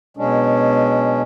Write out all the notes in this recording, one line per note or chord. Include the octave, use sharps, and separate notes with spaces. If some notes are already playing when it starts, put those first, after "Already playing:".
B2 F#3 G#3 C#4 D4